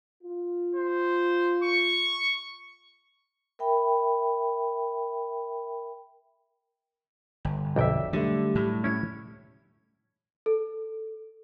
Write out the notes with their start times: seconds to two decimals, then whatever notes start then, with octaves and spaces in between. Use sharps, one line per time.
0.23 F4
0.75 C5
1.64 C#6
3.59 A#4 E5 G5 B5
7.45 G1
7.76 B1 F2 D5 E5 G5
8.13 D3 F#3 G3 A3 G4
8.55 A2
8.84 C#4 E4 C#5 G#6
10.46 A4